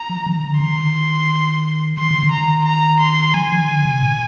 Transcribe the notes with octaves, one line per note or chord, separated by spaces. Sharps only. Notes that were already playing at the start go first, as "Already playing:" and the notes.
Already playing: A#5
F3
D#3
D3
D#3 C6
D#3 C6
D3
D#3
A#5
A#5
C6
F3 G#5
D#3
D3
C3
A#2